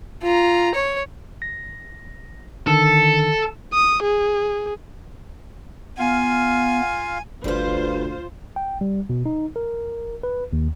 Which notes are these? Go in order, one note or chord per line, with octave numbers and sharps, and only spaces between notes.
F4 A#5
C#5
A#6
D3 D#3 A4
D#6
G#4
B3 F4 F5 G#5
G1 D2 G3 F4 B4 C5
G5
G3
B2
D#4
A#4
B4
D#2